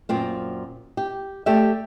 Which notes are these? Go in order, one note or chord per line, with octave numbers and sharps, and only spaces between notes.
F#2 A#2 C4 F4
G4
A3 G4 A4 D5 E5